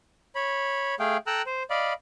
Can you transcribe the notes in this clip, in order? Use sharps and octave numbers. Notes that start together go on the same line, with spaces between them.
C#5 B5
A3 G#4 F5 G5
A4 G5 A#5 E6 F#6
C5
D5 D#5 F5 B5